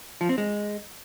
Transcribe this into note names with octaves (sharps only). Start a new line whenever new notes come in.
F3
C4
G#3